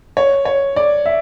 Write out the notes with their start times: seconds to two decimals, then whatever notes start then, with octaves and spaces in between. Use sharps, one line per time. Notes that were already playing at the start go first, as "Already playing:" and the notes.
0.17 C#5
0.45 C#5
0.76 D5
1.06 E5